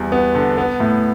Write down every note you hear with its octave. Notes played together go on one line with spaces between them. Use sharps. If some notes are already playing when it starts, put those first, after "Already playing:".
Already playing: E2 G3
B3
D3
B3
A2